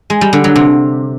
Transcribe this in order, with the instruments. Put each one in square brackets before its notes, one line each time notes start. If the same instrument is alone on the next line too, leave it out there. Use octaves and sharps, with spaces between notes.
[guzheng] G#3
G3
D3
F#3
C3